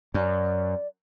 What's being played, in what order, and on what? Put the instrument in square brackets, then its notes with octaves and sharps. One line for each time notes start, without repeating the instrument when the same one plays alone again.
[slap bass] F#2 [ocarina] D5